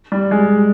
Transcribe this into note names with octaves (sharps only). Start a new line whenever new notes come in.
G3
G#3